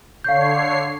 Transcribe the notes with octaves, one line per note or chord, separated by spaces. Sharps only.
D3 C#5 F5 G6 C7